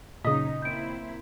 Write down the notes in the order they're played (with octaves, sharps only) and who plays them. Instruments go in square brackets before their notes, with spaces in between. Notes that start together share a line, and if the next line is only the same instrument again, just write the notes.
[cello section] F#2 C#4 D#4 [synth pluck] A#2 C#3 [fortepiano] D#5 [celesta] D#6 B6
[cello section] A#3 C4 E4 [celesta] G6 D7